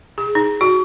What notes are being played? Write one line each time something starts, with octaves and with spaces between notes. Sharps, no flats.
G#4
D#4
F#4